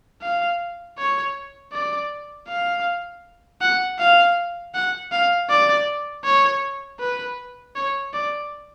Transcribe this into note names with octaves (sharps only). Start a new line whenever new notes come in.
F5
C#5
D5
F5
F#5
F5
F#5
F5
D5
C#5
B4
C#5
D5